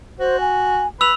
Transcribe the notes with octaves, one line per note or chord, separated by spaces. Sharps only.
F#4 C5
G#5
B4 E6 F7